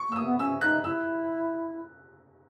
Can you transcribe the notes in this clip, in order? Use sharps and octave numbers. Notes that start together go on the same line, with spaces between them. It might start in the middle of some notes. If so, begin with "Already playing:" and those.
Already playing: C#6
A#3 E6
D#6
B3
C#4 E6
D#4 F#6
E4 E6